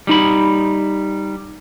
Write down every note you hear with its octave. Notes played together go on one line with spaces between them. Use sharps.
G3 D#4 B5